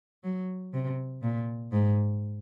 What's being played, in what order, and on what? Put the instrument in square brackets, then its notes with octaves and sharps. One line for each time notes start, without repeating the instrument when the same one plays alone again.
[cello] F#3
C3
A#2
G#2